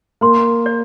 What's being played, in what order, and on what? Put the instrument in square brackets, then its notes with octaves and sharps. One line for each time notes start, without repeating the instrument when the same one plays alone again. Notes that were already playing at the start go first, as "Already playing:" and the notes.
[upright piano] A#3 [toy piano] C6
[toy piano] D5